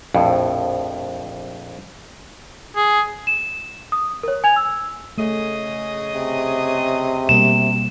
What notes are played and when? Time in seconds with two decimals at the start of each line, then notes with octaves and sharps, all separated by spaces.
0.14 A#1 F2 A2
2.76 G#4
3.27 E7
3.92 D#6
4.23 A#4 C#5
4.44 G#5 G#6 F7
4.56 E6
5.18 C#3 A3 G#4 D#5
6.13 C3
7.29 B2 G3 A#3 E7